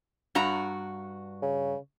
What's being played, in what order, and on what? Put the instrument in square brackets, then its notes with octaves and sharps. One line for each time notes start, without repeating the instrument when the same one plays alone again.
[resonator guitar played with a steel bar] G2 F#4 A#5
[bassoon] C#3